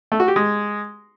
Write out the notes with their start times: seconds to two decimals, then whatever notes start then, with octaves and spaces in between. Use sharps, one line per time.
0.12 A3
0.20 F#4
0.28 G4
0.36 G#3